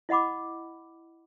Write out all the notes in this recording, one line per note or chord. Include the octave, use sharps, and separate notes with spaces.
E4 D#5 F#5 B5 D6